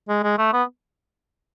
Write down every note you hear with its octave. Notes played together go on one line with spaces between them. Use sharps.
G#3
G#3
A3
B3